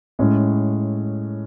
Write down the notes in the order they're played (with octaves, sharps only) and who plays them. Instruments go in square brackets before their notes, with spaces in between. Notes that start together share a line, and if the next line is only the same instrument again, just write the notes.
[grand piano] A2 G#3 C#4